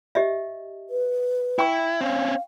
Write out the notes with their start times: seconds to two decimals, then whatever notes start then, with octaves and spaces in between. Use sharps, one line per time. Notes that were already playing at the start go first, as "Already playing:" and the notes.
0.15 G4 D#5 E5
0.90 B4
1.59 E4 G5 C#6
2.01 C4 C#4 F5